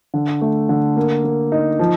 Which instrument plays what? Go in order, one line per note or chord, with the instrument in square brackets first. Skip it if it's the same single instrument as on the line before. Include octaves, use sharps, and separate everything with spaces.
[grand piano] D3
A3
D3
A#3
A#3
D#4
F3